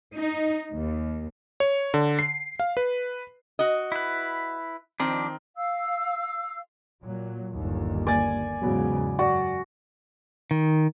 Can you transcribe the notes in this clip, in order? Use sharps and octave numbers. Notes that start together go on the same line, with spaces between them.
D#4
D#2
C#5
D3
C7
F5
B4
F#4 D#5
E4 B4
D#3 F3 C4 D4
F5 E6
A#2 F#3
G1 D#2
A#3 D5 G#5 A6
E2 G#2 C#3 F#3 B3 F#4
F#2 F#4 D5
D#3